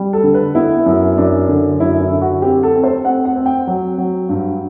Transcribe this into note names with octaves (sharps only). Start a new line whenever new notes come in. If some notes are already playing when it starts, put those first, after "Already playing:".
Already playing: G3
A4
D3
B4
B3 E4
F#2
F#2 D4
D3
F#2 E4
E4
D3
F#4
C4 G4
A4
C4
C5
C4 F#5
F#5
C4
G5
F#3
F#3
G2